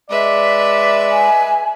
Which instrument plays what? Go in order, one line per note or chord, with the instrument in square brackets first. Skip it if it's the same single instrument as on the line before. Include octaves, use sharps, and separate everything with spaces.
[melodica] G#3 [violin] B4 E5 [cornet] D5
[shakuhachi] G#5